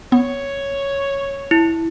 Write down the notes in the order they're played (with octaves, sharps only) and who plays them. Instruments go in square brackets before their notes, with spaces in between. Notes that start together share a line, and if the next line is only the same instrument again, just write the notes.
[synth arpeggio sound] B3 [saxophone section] C#5
[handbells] E4